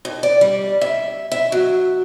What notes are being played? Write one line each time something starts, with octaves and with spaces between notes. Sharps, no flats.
D#2
D5
G3
E5
E5
F#3